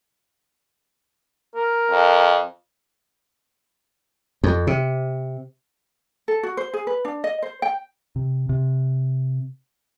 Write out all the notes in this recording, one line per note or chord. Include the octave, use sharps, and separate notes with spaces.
A#4
F2
F2
C3
A4
F#4
C5
G#4
B4
D4
D#5
C5
G5
C3
C3